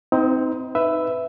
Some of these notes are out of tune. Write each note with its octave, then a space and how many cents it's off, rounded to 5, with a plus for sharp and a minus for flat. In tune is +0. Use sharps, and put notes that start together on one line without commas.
C4 -10 D#4 +25 C5 -45
D#4 +0 B4 +15 E5 +0